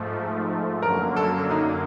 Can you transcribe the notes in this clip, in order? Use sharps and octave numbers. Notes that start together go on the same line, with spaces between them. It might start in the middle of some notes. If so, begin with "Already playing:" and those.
Already playing: G#2 F3 A3
F#2 D3 F#3 A#3 A#4
A4
D#4